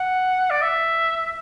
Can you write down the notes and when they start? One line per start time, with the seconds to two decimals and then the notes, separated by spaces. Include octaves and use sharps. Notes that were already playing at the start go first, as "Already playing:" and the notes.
Already playing: F#5
0.50 D5
0.62 E5